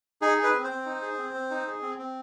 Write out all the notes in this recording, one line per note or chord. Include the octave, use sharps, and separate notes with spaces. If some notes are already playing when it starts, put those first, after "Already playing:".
D#4 G#4
G#4
B4
C4
C5
C4
D#4
G#4
C4
C4
D#4
G#4
C4
C4